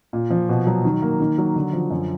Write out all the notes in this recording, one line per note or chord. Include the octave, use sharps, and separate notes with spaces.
A#2
F3
B2
F#3
D#3
A#3
D#3
F#3
D3
F3
F#2